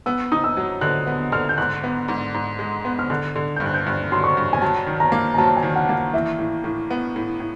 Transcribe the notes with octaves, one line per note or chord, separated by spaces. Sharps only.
B3 E6
D#4 D#6
E6
F#3
D3 F#6
B3
D3 F6
G6
G#2 F#6
B3
G#2
G#2
G#3
B3
F6
D3 F#6
D3
G2 G6
F#6
G6
G2 F#6
F#3 C6
C#6
G2
G#5
F#3 A5
D#3
A#5
A#3
A#5
F#3 A5
G#5
D#3
F#5
A#3
E3 E5
A2
A2
B3
A2
A2